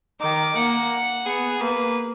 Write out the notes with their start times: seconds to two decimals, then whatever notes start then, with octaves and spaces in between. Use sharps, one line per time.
0.21 D#3 D6
0.56 A#3 F#5
1.25 B3 G#4
1.61 A#3 B4